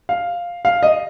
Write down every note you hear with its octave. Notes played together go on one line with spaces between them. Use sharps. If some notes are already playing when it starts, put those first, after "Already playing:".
F5
F5
D#5